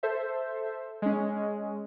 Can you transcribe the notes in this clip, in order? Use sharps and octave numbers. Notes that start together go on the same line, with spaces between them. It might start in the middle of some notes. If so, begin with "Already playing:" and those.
A4 C5 E5
G#3 C#4